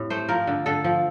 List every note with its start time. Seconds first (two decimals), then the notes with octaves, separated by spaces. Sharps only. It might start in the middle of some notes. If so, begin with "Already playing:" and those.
Already playing: A2 C4 G4
0.10 A3 C5
0.29 F3 A#4
0.47 D3
0.66 D3 A4
0.84 F3